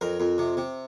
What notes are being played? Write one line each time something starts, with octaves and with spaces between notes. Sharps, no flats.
F2 A#4
F2
C3
C3